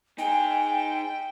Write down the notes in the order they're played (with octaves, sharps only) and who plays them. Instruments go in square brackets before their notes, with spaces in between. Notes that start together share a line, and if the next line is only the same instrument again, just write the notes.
[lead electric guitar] D#4 G#4 [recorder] G5 [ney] G#5